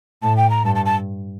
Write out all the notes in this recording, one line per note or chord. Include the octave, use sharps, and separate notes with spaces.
A2 A5
G5
A#5
G2 A5
A5
A5